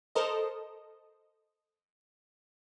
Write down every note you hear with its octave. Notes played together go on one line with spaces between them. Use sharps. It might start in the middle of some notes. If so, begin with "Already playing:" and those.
A4 A#4 C5 D#5